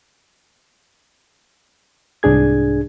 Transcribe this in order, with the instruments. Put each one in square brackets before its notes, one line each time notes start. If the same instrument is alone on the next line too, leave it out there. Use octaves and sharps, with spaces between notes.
[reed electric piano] C2 G#2 D4 G#4 G#6